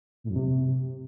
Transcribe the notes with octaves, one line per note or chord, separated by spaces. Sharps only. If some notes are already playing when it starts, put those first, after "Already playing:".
A2
F#2
C3